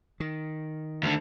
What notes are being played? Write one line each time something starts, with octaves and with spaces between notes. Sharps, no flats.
D#3
D2 D3